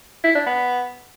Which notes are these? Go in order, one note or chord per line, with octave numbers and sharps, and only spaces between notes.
E4
D4
B3